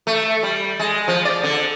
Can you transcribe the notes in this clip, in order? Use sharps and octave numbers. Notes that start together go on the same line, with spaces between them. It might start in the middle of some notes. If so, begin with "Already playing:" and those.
A3
G3
G#3
F3
D5
D3